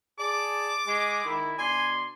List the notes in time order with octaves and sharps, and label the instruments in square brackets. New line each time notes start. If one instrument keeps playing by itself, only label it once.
[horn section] G#4 D5 A5 [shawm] D6
[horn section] G#3
D#3 E4
[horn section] B2 D4 C6 [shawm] G#5